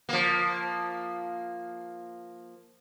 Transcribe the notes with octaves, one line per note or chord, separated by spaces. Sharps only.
F3 A#3